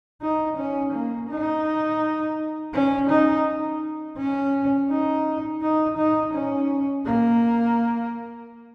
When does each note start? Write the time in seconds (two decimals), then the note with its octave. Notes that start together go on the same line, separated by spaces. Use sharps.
0.22 D#4
0.57 C#4
0.93 A#3
1.29 D#4
2.73 C#4
3.09 D#4
4.17 C#4
4.90 D#4
5.62 D#4
5.97 D#4
6.33 C#4
7.05 A#3